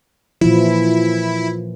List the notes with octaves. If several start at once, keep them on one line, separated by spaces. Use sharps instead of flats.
A#2 E3 F3 E4